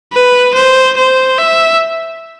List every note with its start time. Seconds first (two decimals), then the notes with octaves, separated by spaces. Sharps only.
0.13 B4
0.55 C5
0.97 C5
1.38 E5